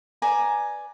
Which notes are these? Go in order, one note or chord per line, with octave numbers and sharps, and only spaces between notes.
B4 D5 G#5 A#5